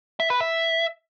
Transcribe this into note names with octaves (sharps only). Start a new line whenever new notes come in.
E5
B4
E5